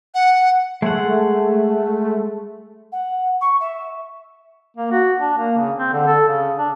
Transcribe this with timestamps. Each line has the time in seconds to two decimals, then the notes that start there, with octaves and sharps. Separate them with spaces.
0.15 F#5
0.82 G#3 A3 F#5
2.92 F#5
3.41 C#6
3.60 E5
4.77 A#3
4.92 F#4
5.20 D4
5.38 A#3
5.58 C#3
5.77 C4
5.93 D3
6.07 A4
6.28 C#3
6.58 D4